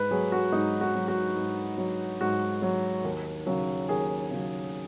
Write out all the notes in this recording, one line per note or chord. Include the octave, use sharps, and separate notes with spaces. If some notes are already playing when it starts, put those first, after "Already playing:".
Already playing: G#2 B4
F#3 G#4
F#4
G#2 D#4
F#4
F#3
F#4
G#2
F#3
G#2 F#4
F#3
D#2
C#3 F#3
D#2 G#4
C#3 F#3